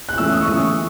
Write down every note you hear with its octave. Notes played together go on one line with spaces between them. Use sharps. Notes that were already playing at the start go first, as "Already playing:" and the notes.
F#6
E3 A3 C#4 E6
D#6
C#6
E3 A3 C#4 D#6